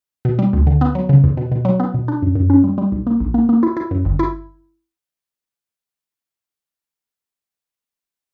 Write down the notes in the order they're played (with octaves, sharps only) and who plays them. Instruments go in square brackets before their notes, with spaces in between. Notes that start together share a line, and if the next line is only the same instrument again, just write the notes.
[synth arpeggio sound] B2
G3
D2
D3
B3
F#3
C#3
E2
B2
B2
F#3
B3
B2
D4
F#2
F#2
C#4
G3
G3
B1
A#3
A#1
A#3
A#3
E4
E4
F#2
G1
E4